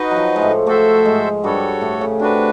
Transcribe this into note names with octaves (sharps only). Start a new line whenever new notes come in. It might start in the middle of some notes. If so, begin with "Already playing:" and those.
Already playing: D#4 F#4 B4 D#5
F#3
F3
G#3
A2 A3
A2 A3 F#4 A4 C5 E5
G#2 G#3
G2 G3 F#4 A4 C#5
A2 A3
C#3 C#4
C3 C4 D4 F#4 B4